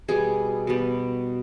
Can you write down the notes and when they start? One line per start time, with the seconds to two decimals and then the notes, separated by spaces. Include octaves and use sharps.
0.08 B2 G3 B3 G#4
0.67 B2 G3 B3